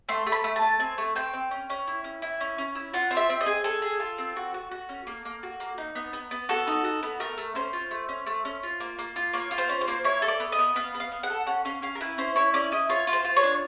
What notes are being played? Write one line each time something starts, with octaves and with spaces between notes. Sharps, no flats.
A3 C6
A3
B5
A3
A5
A3
C4 G#5
A3
C4 G5
C4
C#4
C#4
E4
C#4
E4
C#4
C#4
E4
F4 F#5
C4
E5
C4
D#5
G#4
G#4 A4
G#4
F4
C4
F#4
F#4
F#4
C#4
A#3
A#3
F#4
A#3
D#4
B3
B3
B3
F#4 A4
D#4
F#4
B3
A3 A#4
A3
C#4 C5
F4
A3
C#4
A3
C#4
F4
A#3
A#3
F4
A#3 C#5
F4
C5
C#4
C5
A#3
E4 C#5
A4
D5
B3
D#5
B3
B3 F5
B3
F5
B3
F#5
A4
C#4 F#5
C#4 F5
C#4 F5
A#4
E4 B4
C#4 C5
E4 C#5
C#4 D5
E4 D#5
F4 C#5
F4
C5
F4
C#5
D4